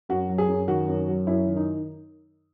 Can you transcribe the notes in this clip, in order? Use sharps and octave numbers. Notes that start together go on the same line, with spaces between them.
F#2 F#4
F#3
G#4
F#2
D#3 F#4
F#2
F#3
F#2 E4
D#3
D#4